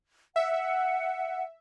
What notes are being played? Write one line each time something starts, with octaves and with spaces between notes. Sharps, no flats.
E5 F#5